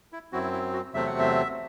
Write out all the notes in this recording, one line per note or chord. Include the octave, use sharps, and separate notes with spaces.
E4
F#2 F#3 C4 E4 F#4
E4
F#4
E2 C3 F#3 A3 C4 E5
F#5
E5